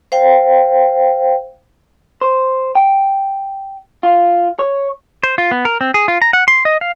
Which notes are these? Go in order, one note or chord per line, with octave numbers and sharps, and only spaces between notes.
C5 F5 G5
C5
G5
F4
C#5
C5
F4
B3
A#4
C4
G#4
F4
A#5
F#5
C6
D#5
F5